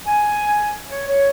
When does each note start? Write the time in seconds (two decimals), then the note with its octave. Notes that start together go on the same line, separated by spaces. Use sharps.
0.07 G#5
0.89 C#5
1.07 C#5